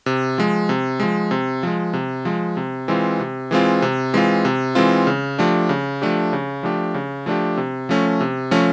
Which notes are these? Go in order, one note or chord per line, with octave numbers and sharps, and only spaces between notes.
C3
F3 G#3
C3
F3 G#3
C3
F3 G#3
C3
F3 G#3
C3
E3 G#3 C4 F4
C3
E3 G#3 C4 F4
C3
E3 G#3 C4 F4
C3
E3 G#3 C4 F4
C#3
F3 A3 D4 G4
C#3
F3 A3 D4 G4
C#3
F3 A3 D4 G4
C#3
F3 A3 D4 G4
C3
F3 A3 C#4
C3
F3 A3 C#4